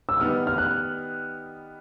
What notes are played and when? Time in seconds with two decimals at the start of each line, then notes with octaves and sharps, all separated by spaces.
0.09 E6
0.19 D#3 G3 B3 D#4 F6
0.47 F6
0.58 F#6